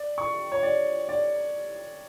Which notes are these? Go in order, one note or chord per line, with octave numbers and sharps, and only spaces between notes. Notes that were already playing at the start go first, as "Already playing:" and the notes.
Already playing: D5
C#6
C#5
D5
D5